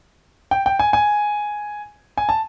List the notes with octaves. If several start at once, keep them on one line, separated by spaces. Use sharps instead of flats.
G5
G5
G#5
G#5
G#5
A5